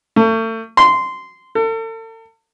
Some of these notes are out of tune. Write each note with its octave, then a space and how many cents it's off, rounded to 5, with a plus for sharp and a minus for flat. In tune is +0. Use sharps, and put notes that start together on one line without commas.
A3 +35
C6 -15
A4 +40